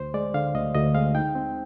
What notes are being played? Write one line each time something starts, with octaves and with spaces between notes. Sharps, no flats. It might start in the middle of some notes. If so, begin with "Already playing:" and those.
Already playing: D2 C5
G#3 D5
D3 F5
D2 D#5
D2 D#5
G#3 F5
D#4 G5
C4